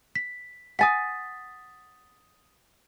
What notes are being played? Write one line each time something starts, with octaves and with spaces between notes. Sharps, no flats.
B6
F#5 G#5 D#6 A6 B6